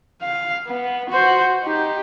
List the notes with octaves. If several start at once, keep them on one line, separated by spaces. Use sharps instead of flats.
F5
B3
F#4 C5
D#4 G4